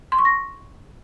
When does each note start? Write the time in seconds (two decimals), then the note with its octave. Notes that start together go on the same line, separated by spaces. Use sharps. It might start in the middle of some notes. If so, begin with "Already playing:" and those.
0.12 C6
0.19 C#6
0.25 A#6